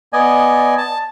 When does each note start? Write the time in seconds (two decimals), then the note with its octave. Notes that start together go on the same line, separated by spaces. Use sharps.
0.13 B3 D5 D#5 G#5
0.78 A5